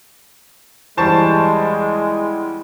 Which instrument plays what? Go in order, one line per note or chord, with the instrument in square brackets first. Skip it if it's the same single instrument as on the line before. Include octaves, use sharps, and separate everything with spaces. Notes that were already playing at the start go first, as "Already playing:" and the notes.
[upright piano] E2 G3 [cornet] G#3 [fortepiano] C5 A5 C#6